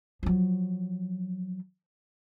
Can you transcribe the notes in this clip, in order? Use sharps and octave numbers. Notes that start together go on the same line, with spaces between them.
F3 F#3